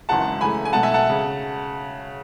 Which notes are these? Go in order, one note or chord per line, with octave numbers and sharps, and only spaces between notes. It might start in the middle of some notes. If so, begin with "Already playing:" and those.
G#1 F#2 C#3 E3 G#3 F#5 A5
F#2 C#3 E3 A3 G#5 B5
G#5
B1 B2 F#3 A3 F#5 A5
E5 G#5
F#5 A5
C#3